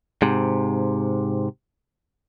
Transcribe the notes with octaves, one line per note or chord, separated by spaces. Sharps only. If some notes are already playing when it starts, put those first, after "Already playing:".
G#2 C3